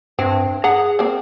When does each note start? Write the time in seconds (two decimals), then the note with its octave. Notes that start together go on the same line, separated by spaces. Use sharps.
0.19 G2 C4
0.64 G#4 F#5 A#5
0.99 A#3 C4